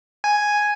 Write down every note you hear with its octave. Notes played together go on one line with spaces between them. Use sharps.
G#5